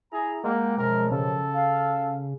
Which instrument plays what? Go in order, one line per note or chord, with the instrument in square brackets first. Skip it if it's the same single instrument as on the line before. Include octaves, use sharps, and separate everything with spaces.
[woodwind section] E4 A#5 [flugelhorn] G#4
[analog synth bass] G#3 [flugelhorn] A#3 [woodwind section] F#5 G5
[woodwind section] F#2 B2 F3 [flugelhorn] A#4
[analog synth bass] C#3 [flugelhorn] A4
[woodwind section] F5